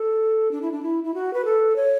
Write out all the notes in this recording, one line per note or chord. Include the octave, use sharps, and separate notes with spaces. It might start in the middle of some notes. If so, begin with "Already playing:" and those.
Already playing: A4
D4
E4
D4
E4
E4
F#4
B4
A4
C#5